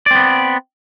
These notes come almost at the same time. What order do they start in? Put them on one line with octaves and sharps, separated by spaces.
D5 C4 B3